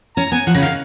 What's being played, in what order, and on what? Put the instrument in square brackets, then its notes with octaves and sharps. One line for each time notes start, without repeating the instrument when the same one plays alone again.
[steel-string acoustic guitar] C#4 [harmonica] A#5
[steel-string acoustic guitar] B3 [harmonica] G#5
[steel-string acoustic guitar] F3 [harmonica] F#5
[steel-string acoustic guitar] C#3
[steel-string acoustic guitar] D#3 [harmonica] F5